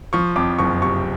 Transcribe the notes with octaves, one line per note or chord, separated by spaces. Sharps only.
F3 C#6
F2 D6
F#1 C#6
C3 C#6